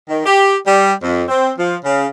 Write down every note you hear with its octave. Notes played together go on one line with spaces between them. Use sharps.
D#3
G4
G3
F2
C4
F3
C#3